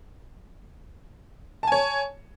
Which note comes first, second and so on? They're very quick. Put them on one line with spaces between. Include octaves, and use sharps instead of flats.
A5 G#5 C#5